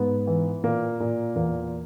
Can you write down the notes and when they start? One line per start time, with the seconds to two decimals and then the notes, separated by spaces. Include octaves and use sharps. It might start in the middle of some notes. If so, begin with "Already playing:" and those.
Already playing: G#2 B3
0.27 E3
0.64 A#2 A#3
1.00 A#2
1.35 E2 A#3